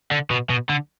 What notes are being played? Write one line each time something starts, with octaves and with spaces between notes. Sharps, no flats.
D3
B2
B2
D3